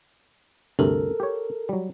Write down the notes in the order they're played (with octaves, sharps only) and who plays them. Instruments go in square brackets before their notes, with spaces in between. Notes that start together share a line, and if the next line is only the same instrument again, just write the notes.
[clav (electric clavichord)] D2 G2 C3 [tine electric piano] A4 A#4
[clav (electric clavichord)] G4 C#5
F#3 G3